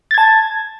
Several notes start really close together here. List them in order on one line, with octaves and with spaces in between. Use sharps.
A6 G#6 A5